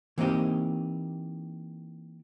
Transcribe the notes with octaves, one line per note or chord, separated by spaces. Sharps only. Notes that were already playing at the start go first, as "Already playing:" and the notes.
E3 A#3 C4 D#4 G4